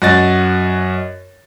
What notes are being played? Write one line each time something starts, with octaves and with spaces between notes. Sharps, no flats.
F#2 F#4 D#5 A6